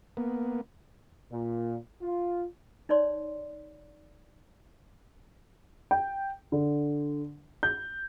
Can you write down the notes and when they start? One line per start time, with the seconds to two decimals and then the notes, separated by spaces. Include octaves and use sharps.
0.17 A#3 B3
1.31 A#2
2.02 F4
2.89 D#4 C#5 D5 C6
5.91 G5
6.52 D3
7.63 G6